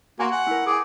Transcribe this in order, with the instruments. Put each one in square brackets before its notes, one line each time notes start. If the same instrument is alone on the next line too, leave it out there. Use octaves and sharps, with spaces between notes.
[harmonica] A#3 F#4 [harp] G#5 C6 C#6
[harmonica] F#5
[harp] E4 A#4
[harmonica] G#4 [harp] G5 D6